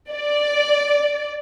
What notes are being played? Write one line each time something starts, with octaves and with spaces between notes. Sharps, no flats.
D5